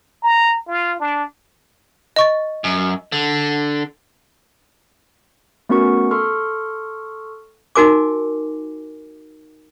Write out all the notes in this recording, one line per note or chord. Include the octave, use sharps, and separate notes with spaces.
A#5
F4
D4
D#5 C#6 A6
F#2
D3
A3 B3 C#4 F#4 A#4 C#6
A4 C6 C#6 F6
D#4 F#4 A#4 G#5 D6